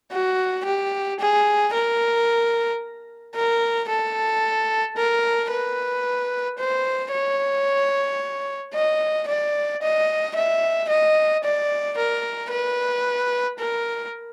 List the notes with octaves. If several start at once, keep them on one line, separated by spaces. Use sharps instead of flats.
F#4
G4
G#4
A#4
A#4
A4
A#4
B4
C5
C#5
D#5
D5
D#5
E5
D#5
D5
A#4
B4
A#4